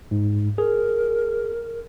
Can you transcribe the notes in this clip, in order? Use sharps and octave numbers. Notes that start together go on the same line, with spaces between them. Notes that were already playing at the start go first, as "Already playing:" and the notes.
G#2
G#4 A#4